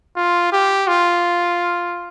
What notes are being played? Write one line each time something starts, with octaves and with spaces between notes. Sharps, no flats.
F4
G4
F4